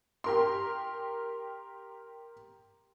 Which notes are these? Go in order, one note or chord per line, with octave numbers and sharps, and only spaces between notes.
G4 A#4 C6